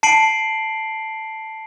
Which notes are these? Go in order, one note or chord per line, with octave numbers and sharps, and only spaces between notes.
A5 C7 D7 F#7